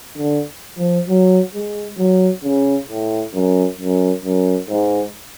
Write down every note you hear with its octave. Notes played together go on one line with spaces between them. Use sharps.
D3
F3
F#3
G#3
F#3
C#3
A2
F#2
F#2
F#2
G#2